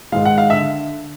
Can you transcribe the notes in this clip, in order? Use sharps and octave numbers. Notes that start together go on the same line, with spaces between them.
G#2 D#3 G#3 F5
F#5
F5
D3 E5